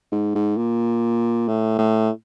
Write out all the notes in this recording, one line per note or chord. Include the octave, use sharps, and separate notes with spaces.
G#2
G#2
A#2
A2
A2